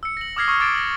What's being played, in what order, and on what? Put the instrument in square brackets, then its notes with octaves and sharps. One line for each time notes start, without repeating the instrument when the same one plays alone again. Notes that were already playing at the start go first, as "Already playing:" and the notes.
[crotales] E6 C#7
A#6 F#7
D6 D#6 F6 G#6 A#6 C7
C#6 D#6 F6 G#6 C7
D6 G#6 A6 D7 E7
A#6 F#7